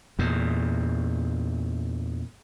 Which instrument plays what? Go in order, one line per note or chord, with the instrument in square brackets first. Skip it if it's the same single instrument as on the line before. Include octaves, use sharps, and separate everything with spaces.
[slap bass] E2 A#2